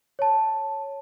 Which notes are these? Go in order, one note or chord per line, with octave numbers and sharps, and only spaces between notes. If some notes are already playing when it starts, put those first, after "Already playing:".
C#5 A5